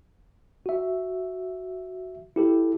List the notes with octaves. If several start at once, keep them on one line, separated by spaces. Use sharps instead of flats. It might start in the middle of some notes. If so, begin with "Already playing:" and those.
F#4 E5
E4 G4 A4